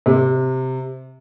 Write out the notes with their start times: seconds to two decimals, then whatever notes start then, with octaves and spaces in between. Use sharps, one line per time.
0.06 C3